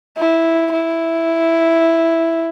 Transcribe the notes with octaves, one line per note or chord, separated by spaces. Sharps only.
E4
E4